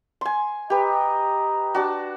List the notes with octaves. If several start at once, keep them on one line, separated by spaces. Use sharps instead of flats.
G#5 C6
G4 B4 D#5 A#5
D4 F#4